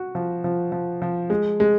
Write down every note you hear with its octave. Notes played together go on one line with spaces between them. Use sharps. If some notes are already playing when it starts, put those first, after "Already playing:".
Already playing: F#4
F3
F3
F3
F3
G#3
G#3